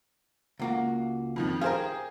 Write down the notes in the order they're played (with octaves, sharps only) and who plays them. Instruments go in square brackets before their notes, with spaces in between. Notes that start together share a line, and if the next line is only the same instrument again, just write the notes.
[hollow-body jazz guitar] C#2 A#3 F#4
[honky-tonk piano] F2 D#3 F3
[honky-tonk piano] G4 G#4 [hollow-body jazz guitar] A#4 C5 F5